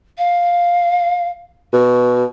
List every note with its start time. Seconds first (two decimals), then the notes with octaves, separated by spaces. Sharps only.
0.18 F5
1.73 B2 F#4